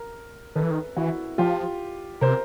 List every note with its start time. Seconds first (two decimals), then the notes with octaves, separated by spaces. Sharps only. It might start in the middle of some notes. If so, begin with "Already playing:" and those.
Already playing: A#4
0.55 D#3 A4 B4
0.63 E3
0.71 D#3
0.97 E3 E4 F#4
1.38 F3 F4 G4
2.21 C3 A#4 C5